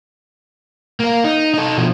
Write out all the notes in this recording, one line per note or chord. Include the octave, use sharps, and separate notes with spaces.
A#3 A#4
D#4
D#4 A4
B2 F3